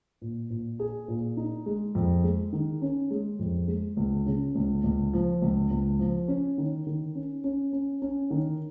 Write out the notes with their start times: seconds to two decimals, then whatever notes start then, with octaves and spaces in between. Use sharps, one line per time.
0.21 A#2
0.50 A#2
0.79 G#4
1.08 A#2
1.37 D#4
1.66 G#3
1.95 F2
2.24 G#3
2.53 D#3
2.82 C#4
3.11 G#3
3.39 F2
3.68 G#3
3.97 C#2
4.26 C#3
4.55 C#2
4.84 C#2
5.13 F3
5.42 C#2
5.71 C#2
5.99 F3
6.28 C#4
6.58 D#3
6.87 D#3
7.15 C#4
7.44 C#4
7.73 C#4
8.02 C#4
8.30 D#3